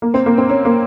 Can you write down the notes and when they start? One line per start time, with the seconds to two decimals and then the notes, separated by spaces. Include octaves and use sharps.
0.02 A#3
0.14 C4
0.26 A#3
0.38 C4
0.49 C#4
0.65 A#3